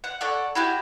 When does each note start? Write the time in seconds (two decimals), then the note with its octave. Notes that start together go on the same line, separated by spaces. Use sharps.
0.04 F#5
0.21 A4 C#5 D5 F#5
0.55 E4 F#4 G4 E5